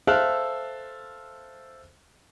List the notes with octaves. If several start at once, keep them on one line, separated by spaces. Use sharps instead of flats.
A4 C5 E5 F5 F6 F#6